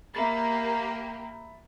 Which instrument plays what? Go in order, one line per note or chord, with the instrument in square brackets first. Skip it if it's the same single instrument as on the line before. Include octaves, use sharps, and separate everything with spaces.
[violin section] A#3 G4 [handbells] E5 B5 A6